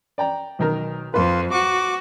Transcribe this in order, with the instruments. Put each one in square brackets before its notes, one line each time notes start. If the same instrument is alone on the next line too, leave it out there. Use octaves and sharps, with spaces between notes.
[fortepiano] D5 G5 A#5
B1 D#3 A#4
[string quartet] F2 [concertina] F4 [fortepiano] B4
[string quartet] F#4 [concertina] D6